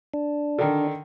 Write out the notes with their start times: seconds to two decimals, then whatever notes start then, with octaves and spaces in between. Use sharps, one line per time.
0.14 D4
0.58 D3 D#3